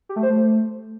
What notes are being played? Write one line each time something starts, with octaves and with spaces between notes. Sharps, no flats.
G4
A3
C5
A3